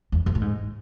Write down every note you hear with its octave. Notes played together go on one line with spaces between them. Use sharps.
E2
F#2
A2
G#2